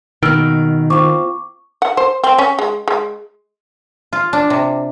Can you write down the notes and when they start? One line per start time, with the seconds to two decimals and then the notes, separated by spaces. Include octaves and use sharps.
0.23 B2 D#3 A#3 E6 F6 D7
0.90 C4 F4 C#6 D6
1.82 F#5
1.97 C5
2.24 C4
2.38 C#4
2.59 G#3
2.88 G#3
4.13 F4
4.33 D4
4.50 C3